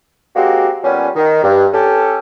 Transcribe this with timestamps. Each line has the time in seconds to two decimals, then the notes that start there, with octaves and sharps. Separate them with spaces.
0.35 G#3 A#3 C4 F#4 G4
0.83 A#2 G3 B3 C#4
1.15 D#3
1.43 G2
1.73 C#4 G4 A4